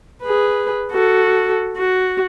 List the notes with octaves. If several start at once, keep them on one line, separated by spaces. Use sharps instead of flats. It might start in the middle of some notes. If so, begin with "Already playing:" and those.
G#4 B4
F#4 A4
F#4